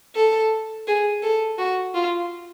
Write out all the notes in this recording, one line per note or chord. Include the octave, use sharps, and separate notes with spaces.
A4
G#4
A4
F#4
F4